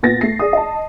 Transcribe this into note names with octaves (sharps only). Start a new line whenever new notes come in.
A#2 B3 A6 A#6
A3 C7
G#4 D5 D#6
D#5 A5